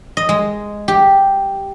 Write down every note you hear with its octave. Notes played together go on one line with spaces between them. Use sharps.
D#5
G#3
G4